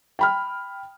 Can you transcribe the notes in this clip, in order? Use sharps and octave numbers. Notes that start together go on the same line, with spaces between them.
G5 B5 F6